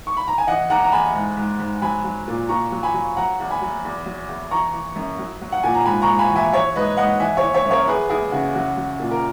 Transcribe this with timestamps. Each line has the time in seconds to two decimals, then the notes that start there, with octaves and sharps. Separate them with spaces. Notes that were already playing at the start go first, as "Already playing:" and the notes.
0.07 C#6
0.17 B5
0.28 A#5
0.38 G#5
0.47 E3 D#5 F#5
0.70 E2 F#5 A#5
0.84 A#5
0.92 E2 G#5 B5
1.14 G#2
1.37 G#2
1.60 G#2
1.82 F#3 G#5 B5
2.05 F#3
2.28 A#2
2.49 A#2 A#5 C#6
2.72 F#3
2.83 G#5 B5
2.94 F#3
3.17 F#3 F#5 A#5
3.40 E2
3.50 G#5 B5
3.61 F#3
3.85 E2
4.06 F#3
4.28 E2
4.51 E3 A#5 C#6
4.74 E3
4.96 F#2
5.19 F#3
5.41 F#3
5.52 F#5
5.63 A#2 G#5
5.74 A#5
5.85 G#2 G#5 B5
6.02 A#5 C#6
6.08 G#2
6.19 G#5 B5
6.30 E3
6.36 E5 G#5
6.52 F#3 C#5 E5
6.75 G#2 B4 D#5
6.97 G#2 D#5 F#5
7.20 E3 E5 G#5
7.37 C#5 E5
7.42 E3
7.54 C#5 E5
7.65 F#2
7.71 A#4 C#5
7.87 E2 G#4 B4
8.09 E2 E4 G#4
8.32 C#3 F#4
8.55 F#3 F#4
8.77 F#3
9.00 A#2
9.11 A#4